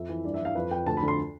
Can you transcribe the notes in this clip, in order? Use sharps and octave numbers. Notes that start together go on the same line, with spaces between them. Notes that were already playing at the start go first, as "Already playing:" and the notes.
Already playing: F2 E5
E3
G2 D5
E5
E3
F5
F2 B4
F2 G5
D2 A5
B5
D3
C6